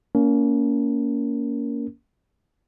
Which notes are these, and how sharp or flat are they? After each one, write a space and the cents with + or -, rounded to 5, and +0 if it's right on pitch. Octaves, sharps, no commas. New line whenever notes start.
A#3 +0 C#4 +30 A#4 +0